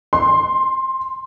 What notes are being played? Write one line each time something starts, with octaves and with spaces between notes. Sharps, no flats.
C6